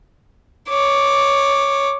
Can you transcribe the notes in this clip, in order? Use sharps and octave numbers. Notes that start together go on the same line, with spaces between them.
C#5 D6